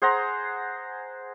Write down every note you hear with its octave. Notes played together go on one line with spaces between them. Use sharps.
G#4 C5 F#5 A#5